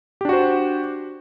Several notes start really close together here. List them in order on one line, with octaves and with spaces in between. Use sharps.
G4 D4 F#4 C5